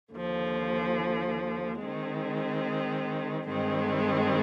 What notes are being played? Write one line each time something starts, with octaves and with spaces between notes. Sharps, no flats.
D#2 D3 F3
D#3 G#3 C4
G2 D#3 G#3 C4